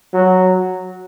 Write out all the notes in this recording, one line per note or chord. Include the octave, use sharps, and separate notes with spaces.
F#3